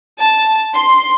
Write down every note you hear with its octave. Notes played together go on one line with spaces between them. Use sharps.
A5
C6